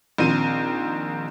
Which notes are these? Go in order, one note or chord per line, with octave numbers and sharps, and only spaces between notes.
A#1 D#3 C4 D#7